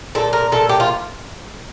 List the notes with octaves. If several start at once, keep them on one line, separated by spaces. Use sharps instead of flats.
A#2 A4
A#4
A#2 A4
G4
F4